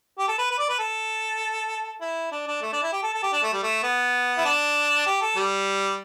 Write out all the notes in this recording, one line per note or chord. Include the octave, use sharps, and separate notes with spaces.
G4
A4
B4
B4
D5
B4
A4
E4
D4
D4
A3
D4
E4
G4
A4
A4
G4
D4
A3
G3
A3
B3
E4
D4
G4
A4
G3